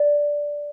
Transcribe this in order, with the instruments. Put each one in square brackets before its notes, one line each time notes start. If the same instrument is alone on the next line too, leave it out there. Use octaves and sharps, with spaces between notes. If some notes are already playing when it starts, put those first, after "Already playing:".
Already playing: [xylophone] D5